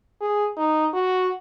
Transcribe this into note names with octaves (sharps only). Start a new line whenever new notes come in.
G#4
D#4
F#4